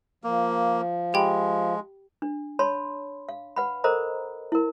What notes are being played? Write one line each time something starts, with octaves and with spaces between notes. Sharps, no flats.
F3 A#3
G#3 G4 G5 B5
D4
C#5 A5 B5 C6
F5
B4 F#5 B5
A4 A#4 C5 D#5 A#5
E4 A#4